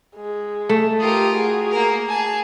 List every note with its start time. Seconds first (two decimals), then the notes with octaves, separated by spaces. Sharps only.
0.15 G#3
0.69 A3
1.00 F4 G4 A#4 D#6
1.34 F#4 G#4
1.71 A#3 A#4
2.09 G#4 G#5 A5